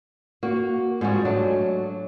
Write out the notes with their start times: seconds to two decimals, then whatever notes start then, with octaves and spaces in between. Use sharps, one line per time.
0.43 A#3 F#4
1.01 G#2 F3 G3 F#4
1.25 F#3 A3 D4